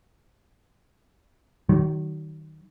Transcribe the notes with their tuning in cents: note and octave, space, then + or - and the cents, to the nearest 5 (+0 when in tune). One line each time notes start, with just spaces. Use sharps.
D#3 +0 F#3 +40